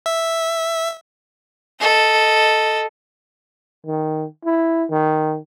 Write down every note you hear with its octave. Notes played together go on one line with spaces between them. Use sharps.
E5
A4 D#5
D#3
E4
D#3